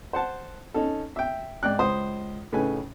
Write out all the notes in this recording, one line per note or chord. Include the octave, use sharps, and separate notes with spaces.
C5 F#5 A5
C#4 D#4 A4
E5 G5
G#2 D5 G5 F#6
C#2 C5 D#6
A2 C#3 A3 D#4 B4 G#5